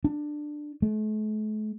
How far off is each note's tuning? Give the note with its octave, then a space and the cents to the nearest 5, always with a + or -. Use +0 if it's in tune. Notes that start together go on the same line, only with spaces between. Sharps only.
D4 +15
A3 -45